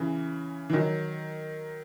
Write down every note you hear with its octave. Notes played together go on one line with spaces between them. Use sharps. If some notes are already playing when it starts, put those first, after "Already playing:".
Already playing: C#3 E3
E3
D#3 F#3